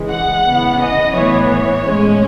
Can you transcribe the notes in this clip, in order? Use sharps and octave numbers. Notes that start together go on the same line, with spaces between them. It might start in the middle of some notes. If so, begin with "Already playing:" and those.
Already playing: C#3 E3 G#3
F#5
C#3 E3 B3
D#5
A2 E3 B3 C#5
C#5
A2 G#3 C#4